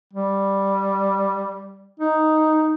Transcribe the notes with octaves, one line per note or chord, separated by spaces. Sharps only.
G3
D#4